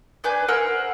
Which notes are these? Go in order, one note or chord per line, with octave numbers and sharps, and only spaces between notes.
D4 B4 G#5 G6
A#4 C5 F#5 E6